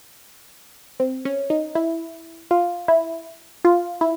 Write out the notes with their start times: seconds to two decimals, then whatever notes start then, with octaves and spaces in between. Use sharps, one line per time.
1.00 C4
1.25 C#4
1.50 D#4
1.75 E4
2.51 F4
2.88 E4
3.65 F4
4.01 E4